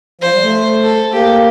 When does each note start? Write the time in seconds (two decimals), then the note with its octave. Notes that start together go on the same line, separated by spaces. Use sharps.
0.21 F3 C5
0.32 G3
0.43 A3
0.83 A4
1.12 A#3 G4